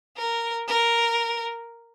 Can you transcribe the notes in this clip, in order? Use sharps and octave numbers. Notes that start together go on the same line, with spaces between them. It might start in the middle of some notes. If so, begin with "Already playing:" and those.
A#4
A#4